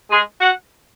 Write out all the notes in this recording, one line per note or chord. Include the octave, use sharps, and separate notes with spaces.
G#3 G#4
F#4 F#5